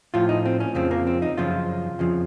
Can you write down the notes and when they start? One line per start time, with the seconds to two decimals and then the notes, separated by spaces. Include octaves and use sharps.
0.14 A2 F3 F4
0.29 D#4
0.45 C4
0.60 C#4
0.75 F2 C#3 F3 C4
0.91 A#3
1.07 C4
1.22 D#4
1.38 F#2 C#3 F3 F4
1.99 F2 C#3 F3